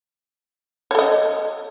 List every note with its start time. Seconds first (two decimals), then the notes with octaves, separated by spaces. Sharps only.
0.91 C#5
0.95 A4
0.99 D#5